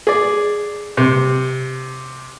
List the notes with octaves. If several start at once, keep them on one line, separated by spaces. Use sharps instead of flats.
G#4 D5
C3